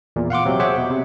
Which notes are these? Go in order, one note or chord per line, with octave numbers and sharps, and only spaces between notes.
E2 A#2
F5 F#5 C6 D6
C3 F#3 C4
G#4 C5 C#5 E5 F#5 D6
B2
C3